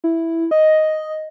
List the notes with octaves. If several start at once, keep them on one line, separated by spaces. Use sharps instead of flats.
E4
D#5